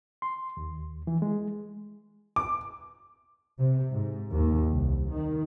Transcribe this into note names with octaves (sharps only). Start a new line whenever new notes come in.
C6
D#2
E3
G#3
D6
C3
G#2
D#2
C2
D#3